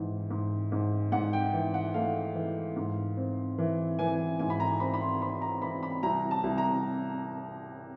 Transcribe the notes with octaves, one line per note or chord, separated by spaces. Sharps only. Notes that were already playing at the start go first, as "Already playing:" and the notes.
Already playing: G#2 E3
G#2
G#2
G#2 F#5
G5
E3
F#5
A3 F5
E3
G#2
C4
E3
E3 G#5
G#2 G#5
B5
A#5
C4 B5
B5
C6
C4 B5
A#5
E3 B5
B5
C2 A#5
A5
C2
A#5